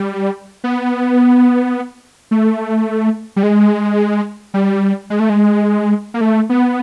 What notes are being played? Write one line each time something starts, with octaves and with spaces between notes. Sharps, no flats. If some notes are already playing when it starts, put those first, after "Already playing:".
Already playing: G3
B3
A3
G3
G#3
G3
G#3
A3
G#3
A#3
A3
B3